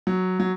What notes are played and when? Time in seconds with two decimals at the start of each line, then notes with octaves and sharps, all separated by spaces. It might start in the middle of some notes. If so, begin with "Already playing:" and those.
0.07 F#3
0.40 F#3